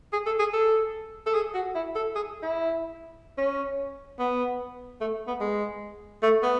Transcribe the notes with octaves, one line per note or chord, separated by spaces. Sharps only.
G#4
A4
G#4
A4
A4
G#4
F#4
E4
A4
G#4
E4
C#4
B3
A3
B3
G#3
A3
B3